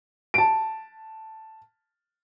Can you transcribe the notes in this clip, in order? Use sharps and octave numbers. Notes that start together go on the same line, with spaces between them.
A5 D7